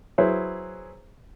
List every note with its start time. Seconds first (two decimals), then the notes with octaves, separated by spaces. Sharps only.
0.18 F#3 E4 G#4 B4 C5